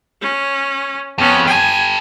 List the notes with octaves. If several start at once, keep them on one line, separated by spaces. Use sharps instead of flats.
C#4
F2 B3 C#4
G4 A4 G#5